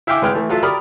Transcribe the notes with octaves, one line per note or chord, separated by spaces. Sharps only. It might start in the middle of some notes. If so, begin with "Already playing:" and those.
E4 E5 F5 G5 G#5 D6
G#1 G#3 B4 G5 F6
E3 A3
F#3 F4 A4 E5
G4 A#4 D5 B5 D#6 F6